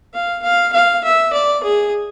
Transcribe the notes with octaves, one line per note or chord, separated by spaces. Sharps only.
F5
F5
F5
E5
D5
G#4